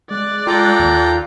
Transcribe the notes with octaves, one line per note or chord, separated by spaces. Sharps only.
G#3 D5 F#6
F4 A4 G5 A#5
D#2